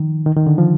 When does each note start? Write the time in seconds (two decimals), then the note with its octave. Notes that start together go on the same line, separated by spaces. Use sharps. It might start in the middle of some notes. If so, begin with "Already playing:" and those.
Already playing: D#3 F3
0.26 D#3
0.36 D#3
0.47 D3
0.58 F3